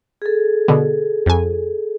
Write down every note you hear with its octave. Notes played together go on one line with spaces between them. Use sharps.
G#4 A4
B2 D3
F2 G#5